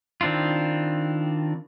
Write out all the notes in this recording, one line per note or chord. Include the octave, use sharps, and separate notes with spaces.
D#3 C4 D4 E4 F4